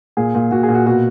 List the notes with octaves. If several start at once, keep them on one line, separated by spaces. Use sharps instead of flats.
A#2 G#4
A#2
A#2 F#4
G#4
A#2
F#4
B2 F#4